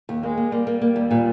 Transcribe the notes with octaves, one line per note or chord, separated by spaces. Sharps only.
D#2
G#3 A#3
A#3
G3 A#3
A#3
A#3
D#2
A#2